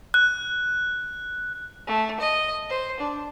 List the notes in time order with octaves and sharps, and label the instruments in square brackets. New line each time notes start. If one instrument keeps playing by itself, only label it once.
[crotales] F#6
[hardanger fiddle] A3
D#5
C5
D4